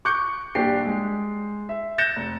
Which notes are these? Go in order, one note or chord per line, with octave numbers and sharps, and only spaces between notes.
C#6 D6 F#6 G6 C#7
D#1 A#1 D4 G4 C7
G#3
E5
F#6 G6 A6 A#6 C#7 E7
F1